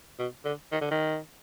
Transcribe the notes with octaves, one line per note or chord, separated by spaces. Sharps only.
B2
D3
D#3
D3
D#3